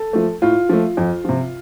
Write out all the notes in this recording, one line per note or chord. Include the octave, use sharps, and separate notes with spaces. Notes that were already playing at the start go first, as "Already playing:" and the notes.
Already playing: A4
F3 A3
A2 F4
F3 A3
F2
C3 F3